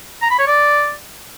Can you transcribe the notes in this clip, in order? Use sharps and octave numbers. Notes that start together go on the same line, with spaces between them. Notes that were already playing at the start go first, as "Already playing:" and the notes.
A#5
B5
C#5
D5